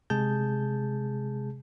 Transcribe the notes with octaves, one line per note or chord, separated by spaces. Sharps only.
C3 G#3 G#4 A5 G6